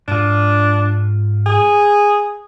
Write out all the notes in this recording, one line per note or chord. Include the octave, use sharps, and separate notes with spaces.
G#2 D4 F4
G#4